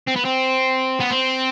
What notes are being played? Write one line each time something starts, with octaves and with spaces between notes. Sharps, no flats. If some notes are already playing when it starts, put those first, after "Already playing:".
C4
B3
C4
B3
C4